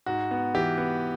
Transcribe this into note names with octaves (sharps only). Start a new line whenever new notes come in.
G#2 F#4
B3
E3 G4
B3